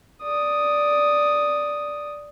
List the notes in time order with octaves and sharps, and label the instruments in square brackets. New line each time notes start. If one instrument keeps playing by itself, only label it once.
[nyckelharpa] D5 D#6